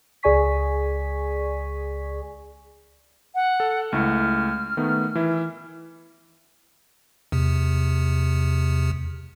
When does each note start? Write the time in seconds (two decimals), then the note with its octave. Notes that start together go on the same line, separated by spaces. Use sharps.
0.23 C#2 G#4 D5 G#5 C#6 B6
3.35 F#5
3.60 A4
3.92 C#2 A3 E4 F6
4.77 D#3 A3 B3
5.15 E3 E4
7.32 E2 C3